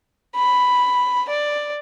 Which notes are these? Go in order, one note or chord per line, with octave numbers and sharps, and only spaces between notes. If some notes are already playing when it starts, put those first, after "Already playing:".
B5
D5